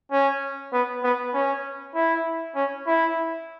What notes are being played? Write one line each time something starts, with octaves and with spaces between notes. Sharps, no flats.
C#4
B3
B3
C#4
E4
C#4
E4